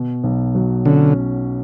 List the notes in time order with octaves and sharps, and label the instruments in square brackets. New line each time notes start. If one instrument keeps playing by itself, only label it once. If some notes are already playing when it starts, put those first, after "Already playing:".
Already playing: [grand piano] B2
B1
F#3
[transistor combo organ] D3 [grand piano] C#4